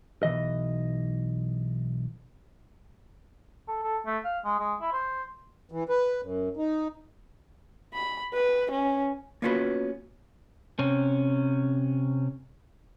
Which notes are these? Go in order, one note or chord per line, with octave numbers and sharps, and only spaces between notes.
B1 E3 D#5
A4
A4
A3
F5
G#3
G#3
E4
C5
E3
B4
F#2
D#4
B5
B4
C#4
A#3 B3 C#4 F4 F#4 B4
C3 C#4